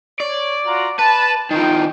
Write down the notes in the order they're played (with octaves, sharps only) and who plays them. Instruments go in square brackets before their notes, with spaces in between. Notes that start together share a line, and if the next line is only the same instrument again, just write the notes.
[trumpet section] C#5 [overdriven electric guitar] D5
[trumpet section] F4 F#4 A#5
[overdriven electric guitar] B4 [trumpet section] A5
[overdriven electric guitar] D#3 F3 [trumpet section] A#4 G5